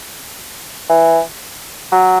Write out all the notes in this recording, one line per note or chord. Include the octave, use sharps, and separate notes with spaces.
E3
F#3